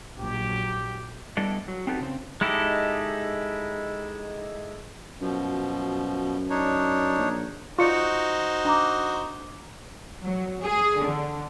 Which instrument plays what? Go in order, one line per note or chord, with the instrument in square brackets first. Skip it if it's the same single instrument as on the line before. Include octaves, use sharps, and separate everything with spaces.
[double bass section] A#1 F#3 [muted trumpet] G4
[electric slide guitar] G3 B3 D4 E4 A4 D#5
F#3
C4 D#4 F#4 G4 A4 B4
C#3 C4
[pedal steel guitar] G#3 D#4 E4 G4 A4
[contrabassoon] F#2 [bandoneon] B2 F3
[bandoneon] D4 D#4 C#5
[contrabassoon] A#1
[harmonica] D#4 F#4 C5 [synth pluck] F4 D5 [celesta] C#6 C#7
[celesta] D4 A#5 D6
[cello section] F#3
G#4
D3